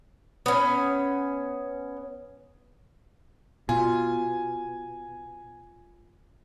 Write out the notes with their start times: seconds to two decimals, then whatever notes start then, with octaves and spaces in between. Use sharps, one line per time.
0.46 B3 C#4
3.69 B2 F4 G#5